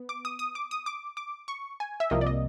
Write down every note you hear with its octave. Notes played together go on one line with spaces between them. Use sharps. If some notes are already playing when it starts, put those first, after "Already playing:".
Already playing: B3
D6
D#6
D#6
D6
D#6
D6
D6
C#6
G#5
E5
C2 C3 F3 A#3 D#5
D5
D#5